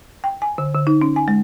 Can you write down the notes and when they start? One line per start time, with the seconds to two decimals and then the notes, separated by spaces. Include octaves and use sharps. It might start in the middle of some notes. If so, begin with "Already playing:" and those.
0.24 G5
0.42 G#5
0.58 D3
0.75 D3
0.87 D#4
1.01 C#4
1.16 G#5
1.28 G#3